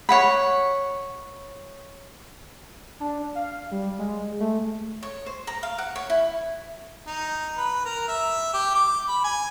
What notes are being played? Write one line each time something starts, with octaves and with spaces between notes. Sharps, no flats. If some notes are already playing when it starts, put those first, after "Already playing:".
C#5 F#5 B5
D4
F5
G3
G#3
A3
C#5
C5
A#5
F5
F#5
C#5
E4
D#4
B4
A#4
E5
G4
D6
B5
G#5